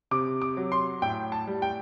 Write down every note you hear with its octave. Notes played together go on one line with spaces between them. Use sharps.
C3 D6
D6
F#3
C6
A2 G5
A5
G3
G5